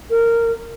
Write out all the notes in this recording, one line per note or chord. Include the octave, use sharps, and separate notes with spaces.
A#4